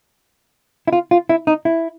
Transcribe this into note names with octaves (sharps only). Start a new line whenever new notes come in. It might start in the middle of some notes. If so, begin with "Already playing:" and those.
E4
F4
F4
E4
D#4
E4